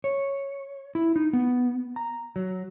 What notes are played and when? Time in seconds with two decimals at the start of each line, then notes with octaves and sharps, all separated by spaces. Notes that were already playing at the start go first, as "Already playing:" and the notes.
0.04 C#5
0.95 E4
1.16 D#4
1.33 B3
1.96 A#5
2.36 F#3